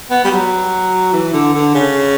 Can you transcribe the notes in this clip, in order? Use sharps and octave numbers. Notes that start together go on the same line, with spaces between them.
B3
G3
F#3
E3
D3
D3
C#3